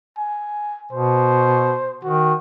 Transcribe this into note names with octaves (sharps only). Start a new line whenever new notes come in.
G#5
B2 C5
D#3 F#4